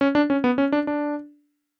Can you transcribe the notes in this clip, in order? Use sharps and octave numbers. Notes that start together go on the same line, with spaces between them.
C#4
D4
C#4
B3
C#4
D4
D4